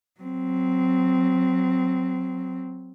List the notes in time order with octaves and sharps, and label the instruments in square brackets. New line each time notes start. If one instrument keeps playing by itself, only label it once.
[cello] F#3 C4